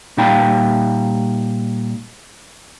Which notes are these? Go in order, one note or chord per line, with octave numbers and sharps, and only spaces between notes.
A#2 G3 D#4 F5 G5 B5